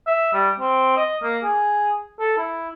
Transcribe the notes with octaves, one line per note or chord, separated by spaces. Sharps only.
E5
G3
C4
D#5
A#3
G#4
A4
E4